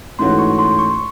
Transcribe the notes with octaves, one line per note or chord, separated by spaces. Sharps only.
G#2 E3 A3 C#4 F#4 C6
C#6
C6
C#6